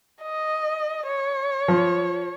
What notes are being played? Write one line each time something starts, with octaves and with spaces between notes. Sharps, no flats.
D#5
C#5
F3